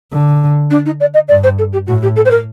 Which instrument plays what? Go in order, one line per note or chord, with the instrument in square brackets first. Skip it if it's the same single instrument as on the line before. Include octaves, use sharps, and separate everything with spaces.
[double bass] D3
[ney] D4
D#4
D5
D#5
[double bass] G2 [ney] D5
[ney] C5
A4
G4
[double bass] A2 [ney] F#4
[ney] G4
A4
C5
A#4